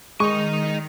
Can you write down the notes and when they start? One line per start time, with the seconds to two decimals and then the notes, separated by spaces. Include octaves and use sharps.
0.20 D#3 G#3 D#4 D#5 C#6